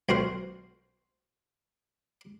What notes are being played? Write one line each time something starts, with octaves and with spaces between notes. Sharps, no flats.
B1 F#4 A#4 C5